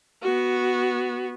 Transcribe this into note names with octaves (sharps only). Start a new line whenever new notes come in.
B3 F#4